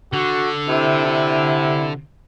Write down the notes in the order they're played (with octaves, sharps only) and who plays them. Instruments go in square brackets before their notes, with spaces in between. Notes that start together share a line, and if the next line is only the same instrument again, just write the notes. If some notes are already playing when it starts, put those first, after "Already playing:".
[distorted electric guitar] D3 [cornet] F#4
[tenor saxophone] C3 [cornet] E4
[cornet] E4